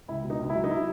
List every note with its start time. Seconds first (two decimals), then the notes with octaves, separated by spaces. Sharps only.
0.08 C#2 E4
0.24 B2
0.30 D#4
0.39 C#2
0.50 E4
0.55 F#3
0.64 D#4
0.71 F#3 E4